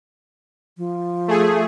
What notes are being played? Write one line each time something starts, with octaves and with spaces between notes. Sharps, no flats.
F3
A3 G#4